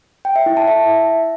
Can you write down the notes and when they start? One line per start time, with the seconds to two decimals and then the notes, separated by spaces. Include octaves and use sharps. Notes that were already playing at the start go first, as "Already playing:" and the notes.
0.25 G5
0.36 E5
0.46 E4
0.57 A5
0.68 E5